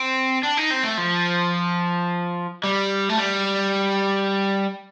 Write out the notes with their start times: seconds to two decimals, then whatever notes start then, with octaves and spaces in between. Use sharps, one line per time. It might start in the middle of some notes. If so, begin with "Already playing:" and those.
Already playing: C4
0.43 D4
0.57 D#4
0.71 C4
0.84 A3
0.97 F3
2.64 G3
3.10 A3
3.18 G3